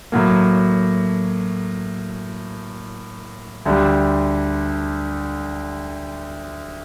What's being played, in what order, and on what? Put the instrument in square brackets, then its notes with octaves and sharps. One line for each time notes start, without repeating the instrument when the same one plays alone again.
[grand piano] A2 F#3 A#3
D2 D3 G3